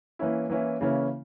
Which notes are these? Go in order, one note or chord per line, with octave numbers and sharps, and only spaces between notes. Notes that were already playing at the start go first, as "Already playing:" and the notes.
E3 A#3 C#4 E4
E3 A#3 C#4 E4
C#3 E3 A#3 C#4 E4